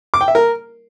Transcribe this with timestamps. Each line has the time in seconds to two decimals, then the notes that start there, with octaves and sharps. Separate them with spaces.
0.14 D6
0.21 G5
0.28 E5
0.35 A#4